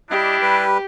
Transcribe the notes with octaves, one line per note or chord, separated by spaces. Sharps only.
G3 D4 E4 G4 D#5
G3 B4